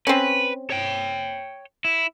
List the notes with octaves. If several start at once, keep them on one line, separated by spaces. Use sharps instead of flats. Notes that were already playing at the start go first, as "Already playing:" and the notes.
C4 C#4 B4
C#5 G5
E4